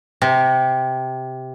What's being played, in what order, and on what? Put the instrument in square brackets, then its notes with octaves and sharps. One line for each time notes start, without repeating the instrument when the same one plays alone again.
[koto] C3